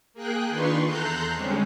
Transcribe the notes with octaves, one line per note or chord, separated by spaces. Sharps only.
A#3 G#4 G5 F#6
D#3 D4 F4 B4 C6 C#6
E2 A4 A#5 C6 F#6 G6
D3 G3 G#3 C4 C#4